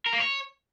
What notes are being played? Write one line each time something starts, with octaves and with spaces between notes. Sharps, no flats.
A#4
A#3
C#5